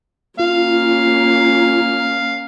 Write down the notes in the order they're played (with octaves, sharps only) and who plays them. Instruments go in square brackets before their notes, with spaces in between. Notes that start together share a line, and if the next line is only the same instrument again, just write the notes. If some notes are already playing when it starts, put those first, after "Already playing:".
[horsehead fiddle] A#3 C#4 [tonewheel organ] F4 [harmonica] F5